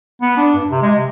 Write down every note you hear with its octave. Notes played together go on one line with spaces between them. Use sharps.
B3
D4
G2
C3
G#3
C3